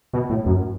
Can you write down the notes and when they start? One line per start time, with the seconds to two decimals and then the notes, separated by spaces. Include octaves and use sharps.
0.13 B2
0.30 A2
0.46 F#2